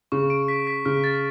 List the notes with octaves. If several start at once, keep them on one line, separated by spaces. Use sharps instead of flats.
C#3 C#6
D7
B6
B6
C#3 F6
A6